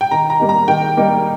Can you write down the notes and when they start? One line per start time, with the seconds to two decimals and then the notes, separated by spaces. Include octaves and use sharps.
0.01 G5
0.11 D#3 A#5
0.30 A#5
0.40 G3 A#3 D#4
0.49 A#5
0.68 D#3 G5
0.97 G3 A#3 D#4